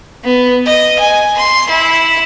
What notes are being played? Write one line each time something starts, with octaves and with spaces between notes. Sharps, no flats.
B3
D#5
G#5
C6
E4